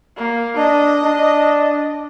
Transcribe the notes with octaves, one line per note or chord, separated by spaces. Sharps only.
A#3
D4 D#5
D4